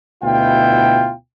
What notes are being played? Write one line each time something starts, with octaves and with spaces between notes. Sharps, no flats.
D2 B2 E4 F4 G5